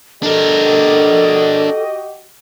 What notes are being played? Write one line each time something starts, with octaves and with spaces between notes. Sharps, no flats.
D4 F#4 G4 A4 A#4 D#5